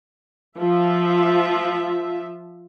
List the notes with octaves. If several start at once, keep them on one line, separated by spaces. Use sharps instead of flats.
F3 F4 E5